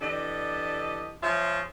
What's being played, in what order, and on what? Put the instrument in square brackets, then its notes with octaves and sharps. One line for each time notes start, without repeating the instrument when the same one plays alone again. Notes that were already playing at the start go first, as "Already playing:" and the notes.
[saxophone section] E3 D4 G4 A4 D5 D#5
F3 F4 G#4 C#5 E5